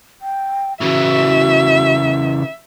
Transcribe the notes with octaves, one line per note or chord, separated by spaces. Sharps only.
G5
C#3 E3 F#4 E5